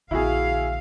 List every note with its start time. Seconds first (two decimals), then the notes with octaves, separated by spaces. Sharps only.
0.11 A#1 D3 E4 F#4 G#4 F5